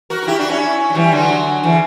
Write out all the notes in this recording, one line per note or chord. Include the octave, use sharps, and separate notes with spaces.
F#4 A#4
A#4
E4 G4
D4 F#4
C#4 E4
F#3
E3 G3
D3 F#3
C#3 E3